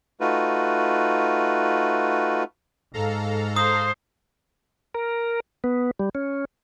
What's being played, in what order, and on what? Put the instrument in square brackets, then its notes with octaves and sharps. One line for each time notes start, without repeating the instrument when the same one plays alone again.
[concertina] A3 D#4 F4 F#4 B4
[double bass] G#2 [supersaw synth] A4 F5 A#5
[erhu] C5 [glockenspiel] D#6
[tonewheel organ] A#4
B3
G3
C#4